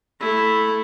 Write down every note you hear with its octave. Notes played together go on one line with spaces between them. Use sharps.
A3 E4